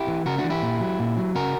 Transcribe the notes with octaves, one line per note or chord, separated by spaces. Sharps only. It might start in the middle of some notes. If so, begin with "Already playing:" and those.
Already playing: E4 G4
E3
C#3 F#4 A#4
D4 F#4
E3
E4 G4
A#2
F#3
A#2
F#3
C#3 F#4 A#4